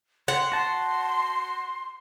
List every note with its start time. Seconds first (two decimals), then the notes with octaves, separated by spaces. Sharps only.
0.28 F#5 C6
0.52 F#4 A5 C6